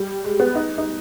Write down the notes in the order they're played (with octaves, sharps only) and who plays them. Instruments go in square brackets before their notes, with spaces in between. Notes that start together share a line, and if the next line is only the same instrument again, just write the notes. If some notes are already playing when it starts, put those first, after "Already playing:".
Already playing: [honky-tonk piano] G3
G#3
B3
D#4
D#4